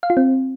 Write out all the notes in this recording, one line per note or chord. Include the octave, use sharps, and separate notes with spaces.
F5
F4
C4